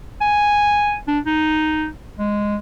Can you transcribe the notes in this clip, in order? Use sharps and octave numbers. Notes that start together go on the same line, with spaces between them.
G#5
D4
D#4
G#3